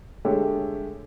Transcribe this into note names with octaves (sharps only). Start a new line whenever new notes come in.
D3 G#3 A3 G4 A4 C#5